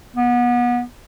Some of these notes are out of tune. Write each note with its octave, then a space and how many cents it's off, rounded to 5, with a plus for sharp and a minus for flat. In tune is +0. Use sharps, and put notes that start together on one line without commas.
B3 -30